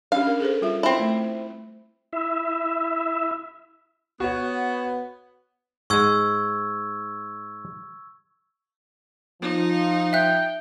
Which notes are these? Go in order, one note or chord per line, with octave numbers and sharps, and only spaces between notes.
C#4 D4 G4 F5
A#4
G#4 A4 C5
G3 F4 E5
C4 E4
A3
E4 E5
B3 F#4 C#5 F#5
G#2 G#3 C#6 E6 G#6
F3 D#4
E5 G5 F#6